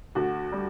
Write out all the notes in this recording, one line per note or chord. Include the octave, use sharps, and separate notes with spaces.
D2 F#4
G3